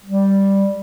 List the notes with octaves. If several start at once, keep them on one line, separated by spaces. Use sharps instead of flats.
G3